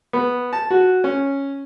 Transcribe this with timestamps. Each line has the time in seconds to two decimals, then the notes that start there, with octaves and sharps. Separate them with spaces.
0.13 B3
0.53 A5
0.71 F#4
1.04 C#4